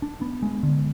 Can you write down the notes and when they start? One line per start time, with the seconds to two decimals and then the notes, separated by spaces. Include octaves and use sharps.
0.02 D4
0.21 B3
0.42 G#3
0.63 D3